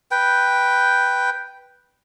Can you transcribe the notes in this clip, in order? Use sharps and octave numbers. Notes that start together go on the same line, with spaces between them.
B4 G5